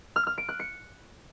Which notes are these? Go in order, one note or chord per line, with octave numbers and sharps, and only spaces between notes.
F6
F6
D7
F#6
C#7